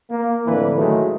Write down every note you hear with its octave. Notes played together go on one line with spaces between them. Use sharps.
A#3
F2 A2 D3 E3 B4
D#3 F#3 G#3 A3